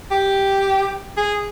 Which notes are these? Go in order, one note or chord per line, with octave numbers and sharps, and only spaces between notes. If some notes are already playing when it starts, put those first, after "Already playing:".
G4
G#4